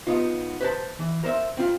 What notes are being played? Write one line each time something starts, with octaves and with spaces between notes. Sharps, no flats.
B3 D#4 F4
B4 C5 A5
E3
A#4 C5 D#5 E5
C4 F4